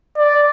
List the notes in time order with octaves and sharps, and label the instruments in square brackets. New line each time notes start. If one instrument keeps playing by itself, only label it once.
[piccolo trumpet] D5